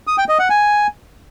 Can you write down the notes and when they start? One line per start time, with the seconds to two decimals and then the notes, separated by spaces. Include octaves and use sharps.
0.07 D#6
0.18 G5
0.29 D#5
0.39 F#5
0.50 G#5